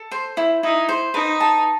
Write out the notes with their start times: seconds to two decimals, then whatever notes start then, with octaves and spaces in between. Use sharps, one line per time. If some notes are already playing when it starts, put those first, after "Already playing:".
Already playing: A4
0.11 C5
0.37 E4
0.63 D#4 E4
0.89 C5
1.14 D#4 B4
1.40 A5